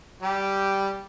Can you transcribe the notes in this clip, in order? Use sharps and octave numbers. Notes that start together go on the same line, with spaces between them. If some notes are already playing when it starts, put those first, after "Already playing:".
G3 G4